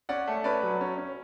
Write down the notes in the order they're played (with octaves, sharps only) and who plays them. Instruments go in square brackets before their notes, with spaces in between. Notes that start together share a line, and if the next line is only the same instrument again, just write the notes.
[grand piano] C#4 D5 F#5
A3
C#4 B4 D5
F#3
C#4
C#4